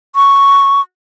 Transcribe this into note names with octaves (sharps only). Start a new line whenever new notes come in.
C#6